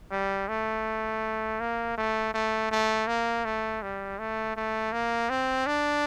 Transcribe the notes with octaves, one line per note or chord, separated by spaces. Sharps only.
G3
A3
A#3
A3
A3
A3
A#3
A3
G3
A3
A3
A#3
C4
D4